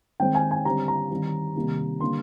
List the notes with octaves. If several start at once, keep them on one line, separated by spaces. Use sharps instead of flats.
D#3 G#3 C4 G5
G#5
G#5
D3 G3 C4 A#5
A#5
D#3 G3 C4
C3 D#3 G3 A#3
D3 G3 A#3 C6